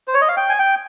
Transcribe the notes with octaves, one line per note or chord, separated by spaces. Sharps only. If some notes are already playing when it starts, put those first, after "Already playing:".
C5
C#5
D#5
F5
G5
G#5
G5